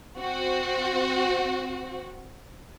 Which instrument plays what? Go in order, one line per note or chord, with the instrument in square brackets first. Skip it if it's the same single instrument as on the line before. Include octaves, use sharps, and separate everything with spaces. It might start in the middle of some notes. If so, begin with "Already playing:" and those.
[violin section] C4 F#4